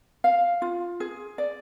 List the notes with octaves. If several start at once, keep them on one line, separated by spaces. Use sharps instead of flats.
F5
F4
G#4
D5